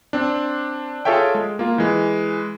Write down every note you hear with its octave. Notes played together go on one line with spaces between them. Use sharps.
C4 D4
F4 G#4 A4 C#5 E5 G5
G#3
A#3 F4
E3 G#3